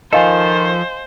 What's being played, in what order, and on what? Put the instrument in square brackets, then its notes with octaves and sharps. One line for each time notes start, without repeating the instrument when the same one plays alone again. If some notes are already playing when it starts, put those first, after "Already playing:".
[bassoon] D#3 [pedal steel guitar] F3 F4 A4 [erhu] C5 [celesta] D#5 F5 G#5